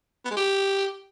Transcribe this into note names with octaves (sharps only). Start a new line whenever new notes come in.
B3
G#3
G4